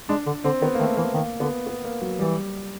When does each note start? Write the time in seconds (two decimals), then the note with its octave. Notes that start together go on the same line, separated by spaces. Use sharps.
0.09 G#3 D4
0.26 D3
0.44 D3 C4
0.61 D#3 B3
0.75 A#3
0.79 D#3 A3
0.97 E3 A#3
1.14 D#3 A#3
1.40 D3 B3
1.67 B3
1.85 A#3
2.02 F#3
2.19 E3 G3